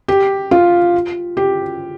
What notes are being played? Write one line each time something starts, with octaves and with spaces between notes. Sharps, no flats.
G4
F4
G4